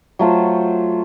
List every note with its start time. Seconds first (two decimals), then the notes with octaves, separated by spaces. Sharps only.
0.19 F#3 A3 F4 C5